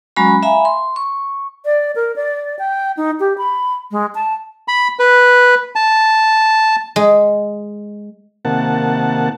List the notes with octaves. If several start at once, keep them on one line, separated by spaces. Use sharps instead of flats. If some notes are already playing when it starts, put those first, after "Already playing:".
F#3 G#3 C#4 F#4 A#5 B5
E5 F5 G#5 A#5 B5
C6
C#6
D5
A#4
D5
G5
D#4
G4
B5
G#3
A5
B5
B4
A5
G#3
C3 D#3 A#3 F#5 A5